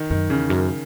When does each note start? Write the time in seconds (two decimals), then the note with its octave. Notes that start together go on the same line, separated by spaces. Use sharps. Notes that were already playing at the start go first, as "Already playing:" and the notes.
Already playing: D#3
0.10 F#2 D#3
0.29 E2 C#3
0.50 F#2